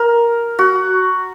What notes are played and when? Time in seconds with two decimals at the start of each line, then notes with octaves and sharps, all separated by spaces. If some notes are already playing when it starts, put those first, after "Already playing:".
Already playing: A#4
0.59 F#4